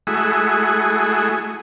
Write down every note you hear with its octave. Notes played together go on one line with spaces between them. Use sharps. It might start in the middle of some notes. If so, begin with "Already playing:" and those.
G#3 A3 E4 F#4 G#4